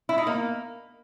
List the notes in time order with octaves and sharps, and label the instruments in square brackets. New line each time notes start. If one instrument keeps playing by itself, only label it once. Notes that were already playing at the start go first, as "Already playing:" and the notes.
[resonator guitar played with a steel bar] E4
D#4
A#3